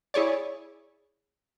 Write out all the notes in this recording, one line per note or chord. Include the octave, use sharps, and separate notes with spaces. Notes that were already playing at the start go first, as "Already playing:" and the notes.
E4 G#4 C#5 D5